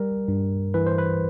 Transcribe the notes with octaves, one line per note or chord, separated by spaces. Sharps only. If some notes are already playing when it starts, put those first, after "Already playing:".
Already playing: G3 A#4
G2
E3 B4
C5
B4